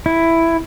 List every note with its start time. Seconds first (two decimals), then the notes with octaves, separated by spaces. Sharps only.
0.06 E4